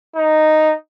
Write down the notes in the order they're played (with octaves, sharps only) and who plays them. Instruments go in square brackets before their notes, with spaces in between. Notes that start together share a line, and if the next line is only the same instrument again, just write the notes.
[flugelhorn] D#4